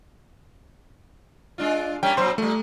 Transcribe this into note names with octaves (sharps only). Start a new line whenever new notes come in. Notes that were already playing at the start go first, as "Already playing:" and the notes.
G#3 D4 F4
G3 A#3 C#4 G5
A#2 F#3 C4 C5 C6
A#2 G3 A3